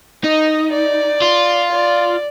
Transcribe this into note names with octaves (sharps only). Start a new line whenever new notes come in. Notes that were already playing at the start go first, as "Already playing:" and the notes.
D#4 D#5
D5
F4
D5